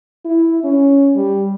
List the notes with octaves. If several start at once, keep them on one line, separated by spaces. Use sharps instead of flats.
E4
C#4
G3